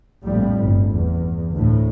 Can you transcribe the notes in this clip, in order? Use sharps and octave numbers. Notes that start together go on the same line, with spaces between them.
A#1 F2 A2 G3
G1
E2
D2 A2